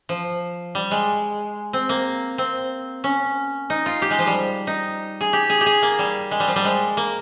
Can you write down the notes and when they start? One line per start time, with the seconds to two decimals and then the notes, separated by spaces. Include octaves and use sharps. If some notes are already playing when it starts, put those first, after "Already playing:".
0.09 F3
0.75 G3
0.91 G#3
1.73 C4
1.89 A#3
2.38 C4
3.04 C#4
3.70 D#4
3.86 F4
4.02 G4
4.11 G#3
4.18 F3
4.27 G3
4.67 D#4
5.21 G#4
5.33 G4
5.50 G#4
5.61 G4
5.66 G#4
5.82 A#3
5.99 G3
6.31 G#3
6.40 G3
6.48 F3
6.56 G3
6.65 G#3
6.97 A#3